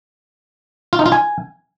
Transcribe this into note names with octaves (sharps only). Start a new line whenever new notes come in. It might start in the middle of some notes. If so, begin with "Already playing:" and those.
F4
D#4
F4
G#5